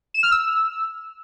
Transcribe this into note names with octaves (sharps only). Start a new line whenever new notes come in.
E7
F6
E6